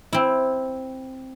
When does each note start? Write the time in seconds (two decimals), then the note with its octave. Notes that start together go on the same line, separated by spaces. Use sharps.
0.13 C4 E4